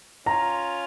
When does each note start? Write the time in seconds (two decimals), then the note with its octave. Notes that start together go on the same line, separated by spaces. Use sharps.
0.26 C#4 F4 A#5